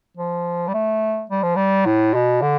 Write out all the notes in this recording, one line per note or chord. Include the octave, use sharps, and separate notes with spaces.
F3
G3
A3
G3
F3
G3
A2
B2
D3